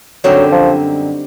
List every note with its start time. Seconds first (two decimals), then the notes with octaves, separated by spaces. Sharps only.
0.24 F#2 D3 F#3 G3 C4 D#4
0.52 F3